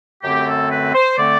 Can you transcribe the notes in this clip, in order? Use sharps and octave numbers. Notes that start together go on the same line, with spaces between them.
F#2 D3 A3 C4 G4
A4
B4
C5
D3 A3 C4 D5